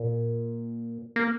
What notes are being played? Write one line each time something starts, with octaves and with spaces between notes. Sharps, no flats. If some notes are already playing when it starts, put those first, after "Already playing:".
Already playing: A#2
A#3